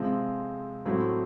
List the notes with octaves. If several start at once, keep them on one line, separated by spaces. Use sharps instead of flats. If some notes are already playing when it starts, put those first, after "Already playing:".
Already playing: C3 F3 G#3 C4
A2 F#3 A3 C4 E4